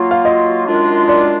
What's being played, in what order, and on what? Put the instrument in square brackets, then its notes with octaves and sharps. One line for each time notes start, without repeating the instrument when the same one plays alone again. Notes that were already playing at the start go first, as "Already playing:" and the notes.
Already playing: [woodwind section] F#3 A#3 F4
[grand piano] F5
D#5
[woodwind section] F#2 D#3 G#3 D4 F4
[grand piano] D5